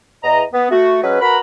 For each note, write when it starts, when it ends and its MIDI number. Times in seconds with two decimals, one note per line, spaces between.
0.24 0.44 40
0.24 0.44 75
0.24 0.44 82
0.53 0.69 59
0.71 1.01 57
0.71 1.01 66
1.04 1.18 54
1.04 1.18 56
1.04 1.18 61
1.04 1.18 71
1.21 1.39 66
1.21 1.39 70
1.21 1.39 71
1.21 1.39 82
1.21 1.39 83